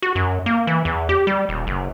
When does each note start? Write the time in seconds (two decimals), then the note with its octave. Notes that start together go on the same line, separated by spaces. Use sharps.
0.02 F#4
0.15 F#2
0.46 A#3
0.67 E3
0.85 E2
1.09 G4
1.27 G3
1.49 D#1
1.67 F#1